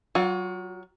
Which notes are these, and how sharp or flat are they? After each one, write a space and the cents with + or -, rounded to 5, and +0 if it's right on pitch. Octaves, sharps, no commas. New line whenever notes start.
F#3 +20 F4 +45